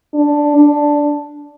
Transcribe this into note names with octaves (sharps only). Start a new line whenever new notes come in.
D4
D4